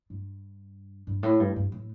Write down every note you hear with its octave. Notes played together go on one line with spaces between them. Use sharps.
G2
G2
A2
G2
G2
A2